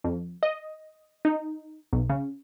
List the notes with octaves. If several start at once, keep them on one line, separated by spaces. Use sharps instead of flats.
F2
D#5
D#4
B1
C#3